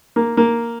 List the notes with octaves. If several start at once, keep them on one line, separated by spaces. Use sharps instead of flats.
A#3
A#3